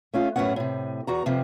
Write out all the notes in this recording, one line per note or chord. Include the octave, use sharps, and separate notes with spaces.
A3 C#4 F4
F#2 A2 C3 B3 C#4 F#5
A2 C3
E2 F#4 A#5
F2 C3 F3